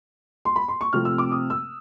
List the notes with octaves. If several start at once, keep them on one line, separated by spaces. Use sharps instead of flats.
C6
B5
C6
C#6
C3 F3 A3 C4 F6
E6
D6
D#6
E6